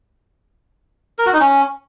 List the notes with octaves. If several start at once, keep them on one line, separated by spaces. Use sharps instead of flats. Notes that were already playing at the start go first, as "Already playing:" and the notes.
A#4
F#4
D#4
C#4